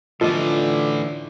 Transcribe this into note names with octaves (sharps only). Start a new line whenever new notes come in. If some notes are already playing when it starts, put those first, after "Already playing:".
A2 D3 E3 F3 F4 A4 D#5 D6